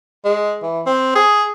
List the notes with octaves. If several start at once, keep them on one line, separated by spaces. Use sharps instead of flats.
G#3
E3
C4
G#4